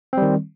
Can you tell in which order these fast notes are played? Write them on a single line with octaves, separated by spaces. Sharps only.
C4 G3 D#3